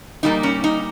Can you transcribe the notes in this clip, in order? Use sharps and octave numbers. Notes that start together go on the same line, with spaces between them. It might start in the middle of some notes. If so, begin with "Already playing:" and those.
A#2 G3 A#3 D#4
C#4
D#4